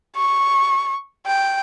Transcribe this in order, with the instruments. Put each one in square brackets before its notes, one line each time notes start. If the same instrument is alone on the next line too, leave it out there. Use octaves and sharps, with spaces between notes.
[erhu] C#6
G5